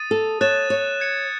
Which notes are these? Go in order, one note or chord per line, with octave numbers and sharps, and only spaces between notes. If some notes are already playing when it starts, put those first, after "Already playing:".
Already playing: D#6 A6 D#7
A4
C#5 F#6 A6 E7
C#5
G#6 C#7 E7